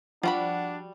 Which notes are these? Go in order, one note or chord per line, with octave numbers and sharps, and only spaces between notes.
F3 G3 D4 F#4 F#5 B5